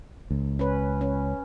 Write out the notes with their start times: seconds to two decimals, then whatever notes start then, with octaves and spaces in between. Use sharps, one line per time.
0.30 C#2
0.59 C#4 B4
1.01 C#4